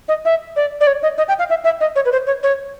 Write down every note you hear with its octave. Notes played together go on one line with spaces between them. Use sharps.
D#5
E5
D5
D5
C#5
D#5
D#5
G5
F5
E5
E5
D#5
C#5
B4
C5
C#5
C#5